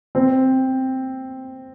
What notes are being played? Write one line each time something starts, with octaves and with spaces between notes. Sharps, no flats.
C4